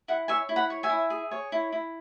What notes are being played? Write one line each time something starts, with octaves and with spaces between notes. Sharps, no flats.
E4 F#5
C#5 E5 G#5
E4
F#5 B5
C#5
E5 G#5
E4
G#4
C#5
E4
E4